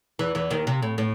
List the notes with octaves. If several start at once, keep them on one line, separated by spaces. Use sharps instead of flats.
E2 E3
E2 E3
D#2 D#3
C3
A2
A2